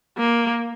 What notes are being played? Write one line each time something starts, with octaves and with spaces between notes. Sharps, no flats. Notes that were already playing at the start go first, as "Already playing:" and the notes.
A#3